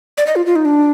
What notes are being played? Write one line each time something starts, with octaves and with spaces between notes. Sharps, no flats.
D5
D#5
F4
F4
D#4
D4